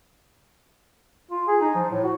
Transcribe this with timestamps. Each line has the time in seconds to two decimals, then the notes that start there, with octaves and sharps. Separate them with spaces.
1.31 F4
1.47 G#4
1.61 D#4
1.75 F3
1.90 A2
2.04 F#4